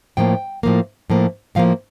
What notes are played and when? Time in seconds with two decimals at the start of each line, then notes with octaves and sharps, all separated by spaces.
0.17 A2 F3 A#3 G5
0.63 A2 F3 A#3
1.10 A2 F3 A#3
1.55 A2 F3 A#3 F5